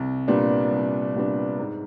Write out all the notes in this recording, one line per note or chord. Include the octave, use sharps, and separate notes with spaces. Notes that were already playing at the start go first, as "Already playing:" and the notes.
Already playing: C2
A#2 G3 B3 D4
C2
A#2 G3 B3 D4
G#2